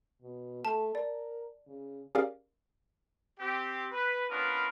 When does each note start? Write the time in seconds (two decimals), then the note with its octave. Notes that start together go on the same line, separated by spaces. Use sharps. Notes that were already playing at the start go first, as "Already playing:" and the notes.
0.22 B2
0.65 A3 A5
0.95 A#4 D5
1.67 C#3
2.15 C#4 G4 G#4 A#4 D5 F5
3.40 C4 G4
3.93 B4
4.30 B3 C#4 D4 F4 A#4 B4